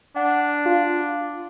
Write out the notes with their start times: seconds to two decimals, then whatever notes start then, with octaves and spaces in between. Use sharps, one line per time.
0.16 D4 F#5
0.66 F4